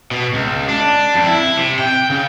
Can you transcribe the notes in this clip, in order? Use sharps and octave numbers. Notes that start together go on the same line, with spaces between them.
B2
C#2
D4
F2
E4
C3
G5
C#3